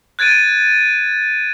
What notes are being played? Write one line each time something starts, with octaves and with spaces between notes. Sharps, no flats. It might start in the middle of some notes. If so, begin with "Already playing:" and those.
F#6 G#6 A6 D7 D#7